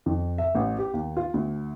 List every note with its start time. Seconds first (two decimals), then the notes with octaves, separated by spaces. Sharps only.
0.06 F2
0.38 E5
0.55 A1
0.78 G4
0.93 D#2
1.17 F4
1.34 D2